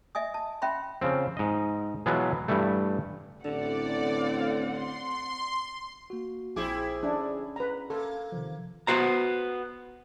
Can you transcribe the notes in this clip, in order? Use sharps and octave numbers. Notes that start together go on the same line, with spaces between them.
D#5 E5 G#5 D#6
A5
C#4 E5 F#5 G5 B5 C6
C#3 F3 C4
G#2 D#5
B2 E3 F#3 G#3 B3 F4
G2 E3 G3 A3
A1 A2 D3 C4 D5 F#5
C6
A#3 F#4
A#1 F3 C4 E4 G#4 D6
C#4 D4
B4 A#5
A#3 A4
C3 D#3 F3
B3 F#4 C5 A#5